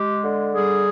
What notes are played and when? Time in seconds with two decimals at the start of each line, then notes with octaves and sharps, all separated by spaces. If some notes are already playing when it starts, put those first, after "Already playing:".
Already playing: G#3 G4
0.22 D3
0.53 G3 G#4